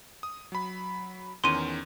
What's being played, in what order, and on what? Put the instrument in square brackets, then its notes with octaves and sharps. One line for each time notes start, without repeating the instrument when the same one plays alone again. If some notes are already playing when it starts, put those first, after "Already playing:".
[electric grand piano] D#6
F#3 B5
[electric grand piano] E2 D#3 C#4 [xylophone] C6 D#7